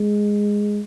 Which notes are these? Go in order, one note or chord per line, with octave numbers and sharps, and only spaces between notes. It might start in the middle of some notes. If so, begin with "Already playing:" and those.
Already playing: G#3